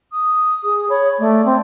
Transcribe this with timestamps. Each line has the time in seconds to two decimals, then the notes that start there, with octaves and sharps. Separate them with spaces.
0.12 D#6
0.64 G#4
0.90 C#5 B5
1.19 A3 D5
1.45 C4